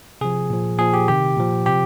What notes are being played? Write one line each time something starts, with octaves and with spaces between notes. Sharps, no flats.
C3 F3 G#4
A#2 F3
A#2 F3 G#4
G4
C3 D#3 G4
A#2 F3
C3 F3 G4